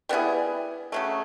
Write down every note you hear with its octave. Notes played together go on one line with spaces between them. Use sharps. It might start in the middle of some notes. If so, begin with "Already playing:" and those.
G3 B3 E4 G#4
C#3 F#3 A3